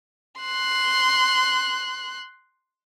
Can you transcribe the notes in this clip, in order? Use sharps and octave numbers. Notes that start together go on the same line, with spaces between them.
C6 F#6